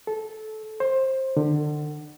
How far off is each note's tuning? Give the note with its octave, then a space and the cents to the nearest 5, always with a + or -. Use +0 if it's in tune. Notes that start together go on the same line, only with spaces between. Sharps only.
A4 -20
C5 +20
D3 +30